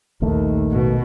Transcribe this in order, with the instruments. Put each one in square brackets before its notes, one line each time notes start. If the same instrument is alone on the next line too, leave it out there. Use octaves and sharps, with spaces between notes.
[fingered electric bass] A#1 D#3 A3 [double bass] D#2
[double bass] B2